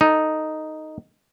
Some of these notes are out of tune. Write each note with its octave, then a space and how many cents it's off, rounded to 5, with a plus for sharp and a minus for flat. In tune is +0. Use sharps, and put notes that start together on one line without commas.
D#4 +0 A4 +0